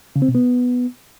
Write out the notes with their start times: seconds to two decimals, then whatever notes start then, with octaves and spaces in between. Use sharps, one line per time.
0.16 C#3
0.22 C4
0.28 B2
0.35 B3